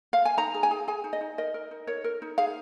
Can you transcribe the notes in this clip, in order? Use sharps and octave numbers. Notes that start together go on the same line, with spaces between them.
F5
G#5
D#4 A#5
G#4
G#5
G#4
G#4 G#5
D#4
D#5
D#4
A#4 D#5
A#4
D#4
A#4 C#5
A#4
D#4
G#4 F5